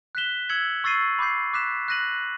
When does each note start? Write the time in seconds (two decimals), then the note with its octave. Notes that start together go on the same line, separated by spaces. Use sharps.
0.15 F#6 B6 E7 G7
0.49 E6 G#6 C#7 F#7
0.84 C#6 E6 A6 C7 D#7
1.19 B5 D6 G6 C7
1.53 D6 F#6 B6 E7
1.88 F#6 A#6 D#7 F#7